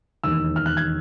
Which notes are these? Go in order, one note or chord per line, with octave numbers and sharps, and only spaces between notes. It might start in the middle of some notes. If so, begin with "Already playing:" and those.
E1 D#2 D#3 E6
F6
F#6
G#6